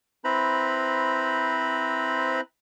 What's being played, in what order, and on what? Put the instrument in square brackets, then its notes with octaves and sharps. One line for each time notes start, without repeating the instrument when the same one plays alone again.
[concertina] C4 E4 B4 C5 A#5 B5